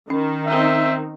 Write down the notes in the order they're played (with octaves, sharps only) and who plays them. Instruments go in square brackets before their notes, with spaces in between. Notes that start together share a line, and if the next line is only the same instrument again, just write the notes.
[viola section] D#3 [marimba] C#4
[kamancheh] C4 D#4 [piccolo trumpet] E5